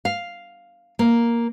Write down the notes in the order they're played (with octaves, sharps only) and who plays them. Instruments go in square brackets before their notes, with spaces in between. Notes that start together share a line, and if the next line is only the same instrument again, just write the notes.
[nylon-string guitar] F5
A#3